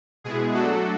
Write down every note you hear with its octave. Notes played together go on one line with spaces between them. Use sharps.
B2 G#3 B3 E4 G#4
F#3 A3 D4 F#4 A4